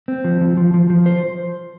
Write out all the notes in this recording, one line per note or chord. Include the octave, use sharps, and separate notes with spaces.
C4
F3
F3
F3
F3
F3
C5